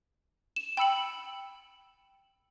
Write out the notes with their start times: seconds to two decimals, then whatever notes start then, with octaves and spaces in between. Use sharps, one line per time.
0.56 E7
0.77 G5 B5 E6 C#7 F#7